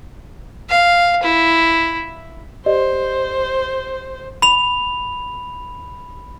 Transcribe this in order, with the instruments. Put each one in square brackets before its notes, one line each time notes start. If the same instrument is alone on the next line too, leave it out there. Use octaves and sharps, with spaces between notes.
[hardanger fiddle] F5
E4
[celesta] G4 D5 D#5 [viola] C5
[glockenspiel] B5 F7